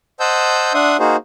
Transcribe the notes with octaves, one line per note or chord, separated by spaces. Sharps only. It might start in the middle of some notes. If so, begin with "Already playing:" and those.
C5 D#5 F#5 A5 E6 G6
D4 E5 F#5 C6 D#6
A#3 D#4 F#4 G#4 C5